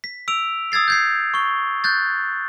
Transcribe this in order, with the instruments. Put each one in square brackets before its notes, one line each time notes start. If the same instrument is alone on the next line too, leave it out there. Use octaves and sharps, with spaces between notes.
[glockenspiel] B6
E6 D7 F7
D#6 E6 G#6 A6 C7
G6 G#6 C7
C#6 G7
F#6 G6 A6